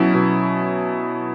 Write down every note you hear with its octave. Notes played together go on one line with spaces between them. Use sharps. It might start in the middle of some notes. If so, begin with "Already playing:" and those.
Already playing: B2 F#3 C#4 E4
B2